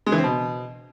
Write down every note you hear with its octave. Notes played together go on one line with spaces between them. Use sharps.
G#3
E3
C4
B2